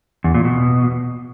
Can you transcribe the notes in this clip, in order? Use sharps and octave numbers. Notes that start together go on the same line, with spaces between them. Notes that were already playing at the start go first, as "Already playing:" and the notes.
E2
A#2
B2